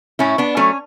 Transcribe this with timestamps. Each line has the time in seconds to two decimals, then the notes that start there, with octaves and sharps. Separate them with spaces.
0.19 A2 C#4 E4
0.38 B3 D4
0.57 F#3 A3 C#4